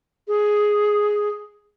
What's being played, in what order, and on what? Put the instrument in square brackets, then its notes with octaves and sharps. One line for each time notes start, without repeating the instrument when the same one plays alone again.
[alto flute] G#4